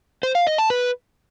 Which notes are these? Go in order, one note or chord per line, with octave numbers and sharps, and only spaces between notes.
C5
F5
D#5
A5
B4